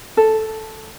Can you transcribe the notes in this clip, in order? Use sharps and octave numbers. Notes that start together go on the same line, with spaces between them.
A4